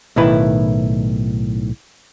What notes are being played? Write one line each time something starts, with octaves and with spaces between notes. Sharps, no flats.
B1 A2 D#3 E4 B4